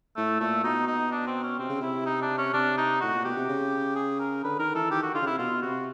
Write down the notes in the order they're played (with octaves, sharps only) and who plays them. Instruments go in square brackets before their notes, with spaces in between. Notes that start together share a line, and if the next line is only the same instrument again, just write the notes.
[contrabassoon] A2 [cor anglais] A3
[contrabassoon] A#2 [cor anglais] A3
[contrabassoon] B2 [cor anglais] D#4
[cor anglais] D#4
D4
C4
C#4
[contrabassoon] C3 [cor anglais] C4
[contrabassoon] C#3
[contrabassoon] C3 [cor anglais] E4
[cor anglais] D#4
D4
C#4
[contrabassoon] C3 [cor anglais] D4
[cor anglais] D#4
[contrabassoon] A2 [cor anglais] F#4
[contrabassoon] A#2
[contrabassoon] B2 [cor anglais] G4
[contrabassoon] C3
C#3
[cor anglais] G#4
A#4
[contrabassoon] D3 [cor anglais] B4
[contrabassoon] D#3 [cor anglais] A#4
[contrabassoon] E3 [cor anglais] A4
[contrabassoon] D#3 [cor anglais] G4
[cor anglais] F#4
[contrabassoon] D3 [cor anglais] F4
[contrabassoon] C#3
[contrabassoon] C3 [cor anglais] E4
[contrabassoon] B2 [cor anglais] F4
[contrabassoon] C3 [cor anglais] F#4